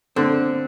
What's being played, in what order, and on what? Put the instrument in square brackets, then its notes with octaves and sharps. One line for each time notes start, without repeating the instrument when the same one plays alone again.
[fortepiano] D3 [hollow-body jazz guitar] C4